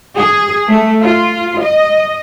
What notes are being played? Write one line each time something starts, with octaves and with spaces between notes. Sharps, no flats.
G#4
A3
F4
D#5